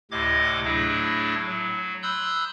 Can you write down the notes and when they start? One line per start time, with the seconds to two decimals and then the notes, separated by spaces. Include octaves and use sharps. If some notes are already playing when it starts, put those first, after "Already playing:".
0.11 D2 A2 C3 D#5 D6 G#6
0.64 A2 F#3 A3 D4 E4 G#4
1.47 F#3
2.03 B5 C6 D#6 E6 F#6 G6